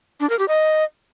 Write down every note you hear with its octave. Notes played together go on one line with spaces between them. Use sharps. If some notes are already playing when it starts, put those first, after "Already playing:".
D4
A#4
G4
D#5